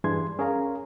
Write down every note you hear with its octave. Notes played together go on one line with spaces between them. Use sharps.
G2 E3 D4 G#4 C6 G#6
C#4 G#4 A#4 C#5 F5 A#5